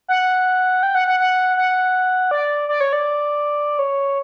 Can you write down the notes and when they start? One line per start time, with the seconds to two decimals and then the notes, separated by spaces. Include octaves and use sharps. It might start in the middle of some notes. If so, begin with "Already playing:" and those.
0.08 F#5
0.83 G5
0.95 F#5
1.07 F#5
1.20 F#5
1.57 F#5
2.31 D5
2.69 D5
2.81 C#5
2.93 D5
3.79 C#5